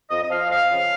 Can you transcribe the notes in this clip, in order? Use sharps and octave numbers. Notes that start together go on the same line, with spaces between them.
F2 D#5
D#5
F3 F5
F2 F5
C#3 F3